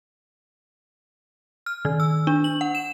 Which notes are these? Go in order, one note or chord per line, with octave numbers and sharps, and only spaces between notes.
F6
D#3
E6
D4
F#7
F#5
E7